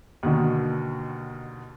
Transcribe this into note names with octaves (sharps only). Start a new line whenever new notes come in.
D#2 B2 D3 D#3